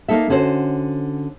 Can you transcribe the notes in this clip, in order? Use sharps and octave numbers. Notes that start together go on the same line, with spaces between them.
A#3 D#4 A4 E5
D3 C#4 F#4 C5